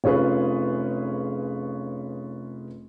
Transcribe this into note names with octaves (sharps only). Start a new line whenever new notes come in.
F1 C#4 F4 G#4 B4